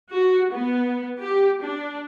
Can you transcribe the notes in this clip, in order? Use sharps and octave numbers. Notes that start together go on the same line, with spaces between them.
F#4
B3
G4
D4